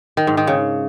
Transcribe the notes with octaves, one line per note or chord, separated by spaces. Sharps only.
D#3
G#2
D#3
C#3